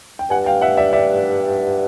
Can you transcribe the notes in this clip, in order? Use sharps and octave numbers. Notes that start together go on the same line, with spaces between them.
G5
G2 F#5 G#5
F5 G5
E5 F#5
D5 E5
D5 E5